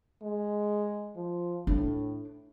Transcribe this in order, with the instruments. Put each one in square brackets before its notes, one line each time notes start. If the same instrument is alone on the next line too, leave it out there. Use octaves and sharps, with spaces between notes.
[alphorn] G#3
F3
[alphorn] A2 [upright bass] D4